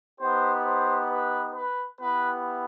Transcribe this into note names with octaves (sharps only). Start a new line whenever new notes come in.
B3 D#4 G4 C5
C5
B4
B4
B3 E4 G4 B4